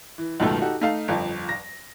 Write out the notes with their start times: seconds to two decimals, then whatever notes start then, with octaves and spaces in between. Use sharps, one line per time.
0.18 E3
0.40 C#2 F#2 B2 D#3 A3
0.62 D#4 F#4 G4 A4
0.81 A3 D#4 F5 A5
1.08 G1 F2 F3
1.49 A#6